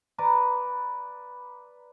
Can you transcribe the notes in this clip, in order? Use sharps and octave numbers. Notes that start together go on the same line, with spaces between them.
B4 D5 A#5